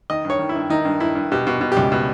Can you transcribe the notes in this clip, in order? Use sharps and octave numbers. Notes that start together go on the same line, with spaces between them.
D#3 D#5
G2
C#5
D#3
E4
G2
D#3 D#4
G2
G2 E4
G2
B2 G4
B2
B2
G4
C#2
B2